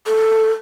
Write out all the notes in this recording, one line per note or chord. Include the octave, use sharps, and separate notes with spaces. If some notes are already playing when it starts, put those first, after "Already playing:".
A4